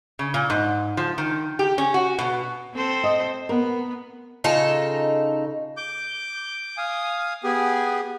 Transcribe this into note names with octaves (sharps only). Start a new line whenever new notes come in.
C#3
A#2
G#2
F3
D#3
G4
C#4
F#4
B2
C4 A4 C5
D#5
B3 A#4
C#3 D#4 F4 A4
D6 G6
F5 G#5 D#6
B3 G4 G#4 G#5